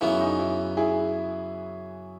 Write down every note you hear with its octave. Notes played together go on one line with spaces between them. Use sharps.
F#2 C#3 E3 B3 E4
D#4
E4
E4 G#4